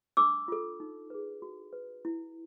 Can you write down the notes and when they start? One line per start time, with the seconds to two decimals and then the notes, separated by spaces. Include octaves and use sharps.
0.17 D4 D6 E6
0.48 F4 A4
0.80 D#4
1.10 G#4 B4
1.42 F#4
1.73 B4
2.05 E4